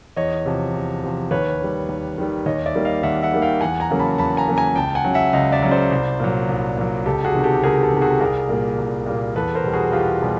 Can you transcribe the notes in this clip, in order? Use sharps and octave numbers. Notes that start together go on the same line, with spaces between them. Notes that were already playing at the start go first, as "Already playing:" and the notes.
E2 C#5 D#5
C3 F3
E2
C3 F3
D#2 B4 C#5
D#3 G3
D#2
D#3 G3
D#2 C#5 D#5
D5 E5
D#3 G3 A#3
D#5 F5
D#2 E5 F#5
E5 F#5
D#3 G3 A#3
F5 G5
E2 F#5 G#5
G#5 A#5
C#3 F#3 A#3
A5 B5
E2 A5 B5
G#5 A#5
C#3 F#3 A#3
G#5 A#5
C#2 G5 A5
F#5 G#5
C#3 F#3
E5 F#5
C#2 D#5 F5
D5 E5
C#3 F#3
C5 D5
C2
A#2 F#3
C2
A#2 F#3
C#2 G4 A4
F#4 G#4
C3 D#3
G4 A4
C#2 G#4 A#4
G4 A4
C3 D#3
F#4 G#4
C2 G#4 A#4
A#2 G3 A#3
C2
A#2 G3 A#3
E2 A4 B4
A#4 C5
B2 G3
F#4 G#4
E2 F4 G4
B2 G3